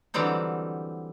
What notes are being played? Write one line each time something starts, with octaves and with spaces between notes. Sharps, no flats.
D3 E3 F#3 G3 C4 D#4